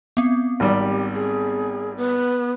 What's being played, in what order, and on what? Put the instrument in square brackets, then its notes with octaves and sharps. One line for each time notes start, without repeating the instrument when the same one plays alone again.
[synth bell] B3 C4
[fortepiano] G#1 G3 [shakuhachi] G4
[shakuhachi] G#4
B3